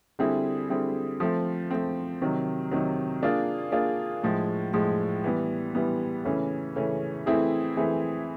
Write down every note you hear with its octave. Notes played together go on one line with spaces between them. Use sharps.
D3 G3 C4 E4 G#4
D3 G3 C4 E4 G#4
F3 A3 C4
F3 A3 C4
C3 D#3 F#3
C3 D#3 F#3
A#3 D4 F4 G#4
A#3 D4 F4 G#4
A2 F3 G#3
A2 F3 G#3
E3 G3 B3
E3 G3 B3
C#3 E3 A3 C#4
C#3 E3 A3 C#4
E3 A3 C4 E4 G#4
E3 A3 C4 E4 G#4